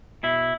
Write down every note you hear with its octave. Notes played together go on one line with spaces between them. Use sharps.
B2 E4